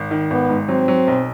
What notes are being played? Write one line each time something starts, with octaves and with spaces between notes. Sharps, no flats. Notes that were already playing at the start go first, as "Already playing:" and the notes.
Already playing: G#1
D#3
G#1 B3
G#2
F#3 C4
F#3
B1